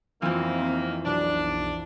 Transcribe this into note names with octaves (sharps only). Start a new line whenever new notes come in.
F2 B2 D#3 E3 A#3 C4
B1 D4